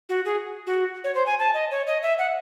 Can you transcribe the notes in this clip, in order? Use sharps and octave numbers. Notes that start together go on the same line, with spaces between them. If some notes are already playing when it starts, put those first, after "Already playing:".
F#4
G#4
F#4
C#5
C5
G#5
A5
D#5
C#5
D#5
E5
F#5